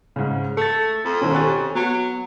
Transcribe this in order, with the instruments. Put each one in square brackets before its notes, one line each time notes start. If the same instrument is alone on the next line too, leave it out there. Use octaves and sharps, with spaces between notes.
[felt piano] G#2 C#3
[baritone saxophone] A3 [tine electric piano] A4 A6 [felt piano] C#7
[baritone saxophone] F2
[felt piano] B2 D#3 [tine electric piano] C#4 A4 C5
[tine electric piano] G4 G#5 C#6 [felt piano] C#5 F#6 A6
[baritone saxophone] F#3 [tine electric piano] B3